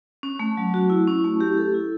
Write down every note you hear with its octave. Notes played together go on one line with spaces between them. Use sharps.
C#4
A3
F#3
F#4
E4
C#4
A3
G4
A4
E4